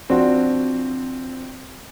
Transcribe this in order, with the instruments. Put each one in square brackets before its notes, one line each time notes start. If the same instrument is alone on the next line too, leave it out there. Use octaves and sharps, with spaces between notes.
[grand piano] F3 C4 D4 F4 F#4